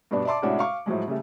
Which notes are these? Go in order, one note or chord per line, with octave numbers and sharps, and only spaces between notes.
G2 B2 D4 D5
D5 E5 A5 C6 D6
A2 C3 G#3 C#4 D4 F#4
F5 C#6 D6
A2 F3 F#3 G#3
C#3 G3 A3